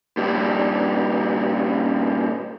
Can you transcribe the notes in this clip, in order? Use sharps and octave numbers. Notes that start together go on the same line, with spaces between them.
G2 A#2